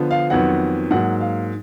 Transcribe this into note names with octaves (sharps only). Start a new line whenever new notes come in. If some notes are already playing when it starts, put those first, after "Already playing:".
Already playing: D3 F3 B3
F5
F2 D#3 F#3 B3 F#5
G#2 F#3 A#3 F#5
F5